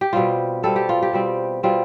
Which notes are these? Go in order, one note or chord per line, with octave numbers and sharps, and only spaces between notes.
G4
B2 G3 C4 F4
B2 G3 C4 A4
G4
F4
G4
B2 G3 C4
B2 G3 C4 F4